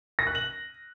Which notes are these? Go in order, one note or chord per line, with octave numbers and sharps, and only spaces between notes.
A#6
F#6
F#7